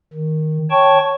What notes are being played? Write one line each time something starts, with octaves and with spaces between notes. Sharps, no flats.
D#3
C#5 G5 A5 C#6